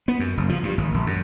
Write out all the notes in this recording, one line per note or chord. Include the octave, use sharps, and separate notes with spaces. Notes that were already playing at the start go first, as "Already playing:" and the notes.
B3
F#2
F#1
F3
G2
G#1
A#1
F#2